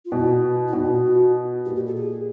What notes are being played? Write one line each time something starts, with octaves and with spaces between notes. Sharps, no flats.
F4
B2 E4
E4
B2 D#4
E4
F4
F#4
A#2 G4
G4
A4
G#4